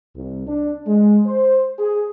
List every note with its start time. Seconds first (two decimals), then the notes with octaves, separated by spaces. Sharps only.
0.16 C2
0.47 D4
0.86 G#3
1.27 C5
1.79 G#4